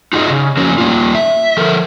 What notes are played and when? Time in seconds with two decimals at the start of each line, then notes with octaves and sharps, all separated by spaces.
0.13 D#4 F4 F#4 G#4 D#5
0.30 C#3
0.57 F3 F#3 A#3 C#4
0.78 G3 A#3 F4
1.14 E5
1.57 F3 A4 A#4